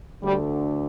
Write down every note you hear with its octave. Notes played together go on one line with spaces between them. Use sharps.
D2 D3 G3